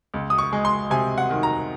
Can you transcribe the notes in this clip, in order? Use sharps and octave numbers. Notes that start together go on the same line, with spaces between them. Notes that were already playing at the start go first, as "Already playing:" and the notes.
C#2
D#6
C#6
G#3
C6
C3 G#5
F#5
D#3
A#5